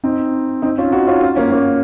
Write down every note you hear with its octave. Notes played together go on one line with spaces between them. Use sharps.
C4 D#4
C4 D#4
C#4 F4
D#4 F#4
C#4 F4
C#4 F4
A#3 C#4
A#3 C#4